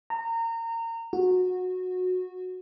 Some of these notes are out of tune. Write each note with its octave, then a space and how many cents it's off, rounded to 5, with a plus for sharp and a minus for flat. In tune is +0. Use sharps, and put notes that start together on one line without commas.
A#5 -25
F#4 -15